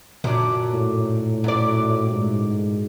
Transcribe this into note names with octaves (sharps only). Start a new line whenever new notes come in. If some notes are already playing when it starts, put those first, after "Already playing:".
F#2 A#2 D4
A2
F#2 D5
G#2